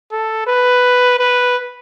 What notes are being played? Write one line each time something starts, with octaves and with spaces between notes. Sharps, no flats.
A4
B4
B4